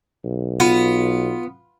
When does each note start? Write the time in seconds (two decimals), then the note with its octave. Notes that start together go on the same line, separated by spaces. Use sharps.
0.25 B1
0.60 B3 F4